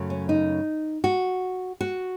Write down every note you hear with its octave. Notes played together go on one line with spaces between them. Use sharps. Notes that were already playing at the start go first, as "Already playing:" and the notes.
Already playing: F#2 C#3 F#3 A3
C#4
D#4
F#4
F#4